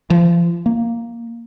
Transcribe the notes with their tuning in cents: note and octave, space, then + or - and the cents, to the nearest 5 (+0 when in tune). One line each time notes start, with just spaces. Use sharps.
F3 -35
A#3 +0